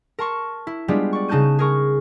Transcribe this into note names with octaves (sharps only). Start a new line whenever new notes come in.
A#4 A5 C6 C#6
E4
G3 G#3 B3 D4 F4 G4
D5 C#6
C#3 D#4 A5 F#6 G6 D#7
G#4 A#4 C#6